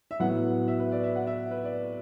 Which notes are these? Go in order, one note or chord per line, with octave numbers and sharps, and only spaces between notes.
E5
A2 F#3 B3 F#5
E5
B4
D5
E5
F#5
E5
B4
D5